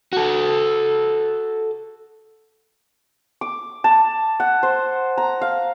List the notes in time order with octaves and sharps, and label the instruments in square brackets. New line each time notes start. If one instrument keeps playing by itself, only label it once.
[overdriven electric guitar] F#4 A4
[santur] D6
A5
F#5
C5
A#5
F5